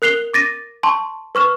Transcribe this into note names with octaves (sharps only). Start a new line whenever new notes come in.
A#4 F#6 C7 F7 G7
D6 A6 A#6 D#7
A5 C6 C#6
B4 C#6 F6 E7